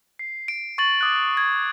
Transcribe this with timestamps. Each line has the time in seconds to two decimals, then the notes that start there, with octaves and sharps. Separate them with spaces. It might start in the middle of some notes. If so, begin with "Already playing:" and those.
0.19 C7
0.48 D7
0.78 C#6 A6 F#7
1.01 D6 D#6 F#6
1.37 G#6